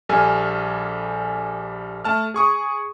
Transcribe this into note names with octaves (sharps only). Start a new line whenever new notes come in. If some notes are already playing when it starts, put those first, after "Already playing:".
A#1 G3 A4 G#5 F6
A3 A5 F6
G#4 C#6 D#6